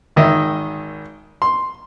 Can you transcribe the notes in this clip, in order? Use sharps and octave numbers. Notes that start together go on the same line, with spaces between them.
G#1 D#3 D#5 E5
C6